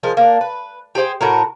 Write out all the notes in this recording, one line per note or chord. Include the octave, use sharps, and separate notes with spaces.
F3 G#3 A#4
A#3 D4
B4
G4 G#4 C5 G5
A2 F#4 A#4